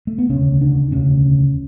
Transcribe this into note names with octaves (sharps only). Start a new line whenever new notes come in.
A3
B3
E1 D2 C#3 C#4
D4
E1 D2 C#3 C#4